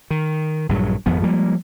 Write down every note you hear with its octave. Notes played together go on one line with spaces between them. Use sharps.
D#3
A#1 G2 F3 F#3
G#1 F2 F3 B3
F3 G3 G#3 A#3